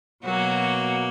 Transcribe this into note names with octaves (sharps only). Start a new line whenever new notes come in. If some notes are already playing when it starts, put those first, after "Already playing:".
B2 F#3 A#3 F#4